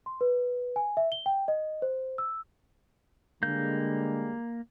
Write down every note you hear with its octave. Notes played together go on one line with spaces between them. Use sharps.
C6
B4
G#5
E5
G7
G5
D#5
C5
E6
D3 G3 G#3 A#3 G6